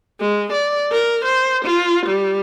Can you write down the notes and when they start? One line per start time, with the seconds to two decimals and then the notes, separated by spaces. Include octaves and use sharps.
0.21 G#3
0.53 D5
0.92 A#4
1.25 C5
1.65 F4
2.07 G3